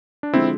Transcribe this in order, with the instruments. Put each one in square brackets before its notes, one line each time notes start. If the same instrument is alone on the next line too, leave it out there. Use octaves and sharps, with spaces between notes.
[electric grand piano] D4
[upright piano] D3 F3 G#3 [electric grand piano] C4 E4